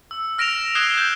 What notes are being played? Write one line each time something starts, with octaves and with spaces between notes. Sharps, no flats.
E6
F6 A#6 D7 E7 F7
D#6 F#6 G#6 C7 E7 G7
G6